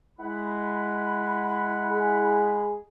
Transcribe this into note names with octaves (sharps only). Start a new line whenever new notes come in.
G#3 E4 F#5 B5
G#4